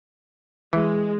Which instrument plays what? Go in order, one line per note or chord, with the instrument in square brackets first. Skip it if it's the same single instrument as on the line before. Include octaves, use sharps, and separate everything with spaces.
[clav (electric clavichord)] E3 [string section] G#3